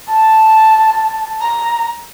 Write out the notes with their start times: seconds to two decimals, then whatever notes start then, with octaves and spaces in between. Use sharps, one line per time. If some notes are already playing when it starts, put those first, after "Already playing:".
0.09 A5
1.41 A#5